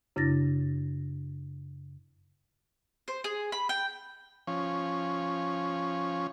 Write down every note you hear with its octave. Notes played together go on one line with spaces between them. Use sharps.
F#2 C#3 D4 E4 A6 A#6
C5
G#4
B5
G5
F3 C#4